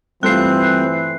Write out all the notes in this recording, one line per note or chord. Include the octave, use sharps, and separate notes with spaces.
G2 E3 A3 C4 F4 F#6 C7